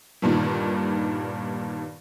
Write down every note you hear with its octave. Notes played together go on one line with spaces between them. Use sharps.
G1 G2 A#2 D#3